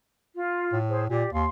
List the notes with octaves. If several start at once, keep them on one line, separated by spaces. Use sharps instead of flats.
F4
A2
G#4 C5
A#2 G4 D5
D#2 F5 C6